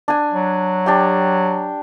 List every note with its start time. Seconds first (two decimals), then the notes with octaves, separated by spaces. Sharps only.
0.08 D4 G#5
0.32 F#3
0.86 D4 G4 G5